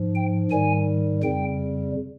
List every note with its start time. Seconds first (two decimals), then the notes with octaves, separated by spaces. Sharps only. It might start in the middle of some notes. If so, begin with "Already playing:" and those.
Already playing: G#2 F3
0.15 G5
0.51 G#2 D#3 G3 G#5
1.23 F2 C#3 G3 G5